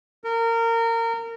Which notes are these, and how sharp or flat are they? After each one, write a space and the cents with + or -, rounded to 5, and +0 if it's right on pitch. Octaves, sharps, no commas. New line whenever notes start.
A#4 -25